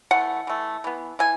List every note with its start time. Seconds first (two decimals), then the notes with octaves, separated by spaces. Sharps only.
0.11 E3 A3 F#5
0.47 E3 A3
0.84 E3 B3
1.19 E3 G#5